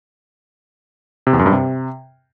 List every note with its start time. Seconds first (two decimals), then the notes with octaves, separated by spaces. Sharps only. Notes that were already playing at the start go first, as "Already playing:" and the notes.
1.27 C3
1.33 E2
1.39 F#2
1.46 G2
1.52 C3